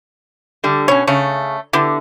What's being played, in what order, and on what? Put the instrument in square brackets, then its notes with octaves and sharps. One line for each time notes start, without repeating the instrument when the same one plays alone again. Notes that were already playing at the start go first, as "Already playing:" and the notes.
[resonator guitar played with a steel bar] D3 G3
[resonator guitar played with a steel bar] B2 C#4 [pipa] C#5
[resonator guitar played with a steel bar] C#3 [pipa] A3 C#5
[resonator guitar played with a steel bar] D3 [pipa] B3 E4 G4